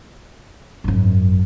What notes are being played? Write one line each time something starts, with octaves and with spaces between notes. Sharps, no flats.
G#1 F#2